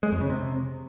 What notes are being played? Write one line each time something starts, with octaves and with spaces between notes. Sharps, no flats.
G#3
F2
C#3
C3